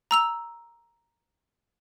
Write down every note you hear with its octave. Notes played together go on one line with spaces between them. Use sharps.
A#5 E6 F7